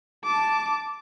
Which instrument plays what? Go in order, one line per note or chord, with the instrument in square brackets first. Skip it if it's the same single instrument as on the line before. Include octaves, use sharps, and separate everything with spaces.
[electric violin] A5 D6